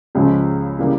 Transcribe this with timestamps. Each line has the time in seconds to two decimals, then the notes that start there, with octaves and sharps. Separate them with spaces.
0.15 C#2 C#3 F3 G#3 C#4
0.79 C#3 E3 G3 A#3